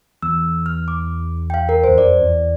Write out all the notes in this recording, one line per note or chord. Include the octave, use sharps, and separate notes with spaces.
E2 E6
F6
D6
G5
F5
A#4
C5
E2
F2 D5
E2